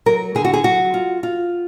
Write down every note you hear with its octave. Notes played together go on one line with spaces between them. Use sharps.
F#3 A#4
D3 G#4
F#4
G#4
F#3 F#4
F4
F4